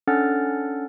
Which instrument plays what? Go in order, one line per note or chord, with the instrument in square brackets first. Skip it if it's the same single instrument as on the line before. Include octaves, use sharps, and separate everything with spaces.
[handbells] C#4 D4 A4 F#5 F6 A6